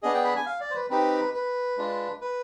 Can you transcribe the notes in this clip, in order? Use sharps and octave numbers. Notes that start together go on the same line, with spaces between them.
B3 D4 G#4 D#5
G5
B5
G#5
F5
D5
C5
B4
C4 D#4 G4 B4
B4
G#3 D4 F4
B4